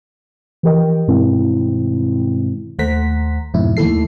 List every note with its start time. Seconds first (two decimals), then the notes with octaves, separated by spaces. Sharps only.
0.63 E3 F3 G4 A#4 D#5 G5
1.08 G2 B2 D#3 G#3 C4 E4
2.79 D#2 A3 C5 F#5 A#5 B6
3.54 F2 G#2 B2 E4
3.77 D#2 A3 E4 A4 C7